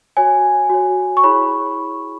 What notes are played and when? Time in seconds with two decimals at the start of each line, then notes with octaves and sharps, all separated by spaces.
0.17 F#4 C#5 G#5
0.70 F#4 C#5
1.17 C#6
1.23 E4 G#4 C#5 B5